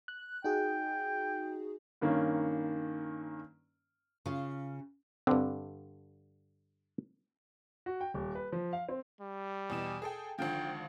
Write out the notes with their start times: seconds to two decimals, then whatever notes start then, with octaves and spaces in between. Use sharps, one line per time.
0.08 F#6
0.44 D#4 F#4 G#4 G5
2.01 G2 D#3 A#3 C#4
4.26 C#3 F4
5.27 G2 D3 C4
7.86 F#4
8.01 G5
8.14 D#1
8.35 B4
8.52 F3
8.73 F5
8.89 C4
9.20 G3
9.70 E2 B2 E7
10.02 G#4 A4 G5
10.38 G#1 D3 F3 G5